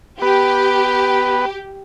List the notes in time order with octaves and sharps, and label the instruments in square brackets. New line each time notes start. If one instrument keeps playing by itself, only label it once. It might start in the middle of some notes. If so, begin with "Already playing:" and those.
[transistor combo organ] B3 B4 [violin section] G4